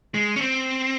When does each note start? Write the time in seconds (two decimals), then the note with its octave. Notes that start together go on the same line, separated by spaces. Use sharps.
0.14 G#3
0.36 C#4
0.41 C4